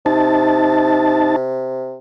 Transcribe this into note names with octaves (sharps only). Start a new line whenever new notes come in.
C3 D#4 A5